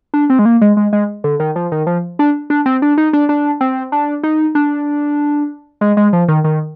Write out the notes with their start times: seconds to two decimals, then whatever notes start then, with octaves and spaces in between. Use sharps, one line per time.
0.14 D4
0.30 C4
0.39 G#3
0.45 A#3
0.61 G#3
0.77 G#3
0.93 G#3
1.24 D3
1.40 D#3
1.56 F3
1.72 D#3
1.87 F3
2.19 D4
2.50 D4
2.66 C4
2.82 D4
2.98 D#4
3.13 D4
3.29 D4
3.61 C4
3.92 D4
4.23 D#4
4.55 D4
5.81 G#3
5.97 G#3
6.13 F3
6.28 D#3
6.44 D#3